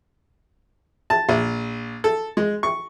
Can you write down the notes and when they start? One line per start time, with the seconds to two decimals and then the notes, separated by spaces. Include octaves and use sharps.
1.10 A5
1.29 A#1
2.04 A4
2.37 G#3
2.63 C#6